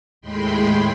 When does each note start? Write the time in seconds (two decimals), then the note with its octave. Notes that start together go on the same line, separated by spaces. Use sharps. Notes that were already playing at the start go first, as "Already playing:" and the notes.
0.21 D#2 A2 G#3 G5 B5 C6